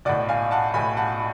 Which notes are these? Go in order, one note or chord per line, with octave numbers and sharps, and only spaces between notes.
B1 A2 D5 F#5
F5 G#5
F#5 A5
B1 A2 G#5 B5
F#5 A5